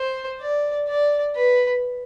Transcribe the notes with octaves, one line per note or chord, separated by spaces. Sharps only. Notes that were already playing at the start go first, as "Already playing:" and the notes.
Already playing: C5
D5
D5
B4